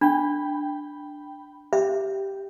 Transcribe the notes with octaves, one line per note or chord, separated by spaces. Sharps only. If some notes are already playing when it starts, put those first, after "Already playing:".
D4 G5 B5
G4 E5